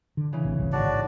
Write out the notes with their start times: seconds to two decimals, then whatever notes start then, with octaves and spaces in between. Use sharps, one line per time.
0.17 D3
0.33 C#3 E3 C#4
0.45 A1 C3
0.59 G1 C2
0.72 A1 G#2 D3 D4 F#4 C#5 D5